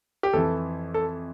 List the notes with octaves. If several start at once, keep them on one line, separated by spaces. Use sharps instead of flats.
G4
F2 E3 A4
A4